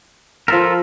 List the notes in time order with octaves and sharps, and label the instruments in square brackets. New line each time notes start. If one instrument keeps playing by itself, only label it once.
[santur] F3 B5 [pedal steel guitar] F4 A4 A#4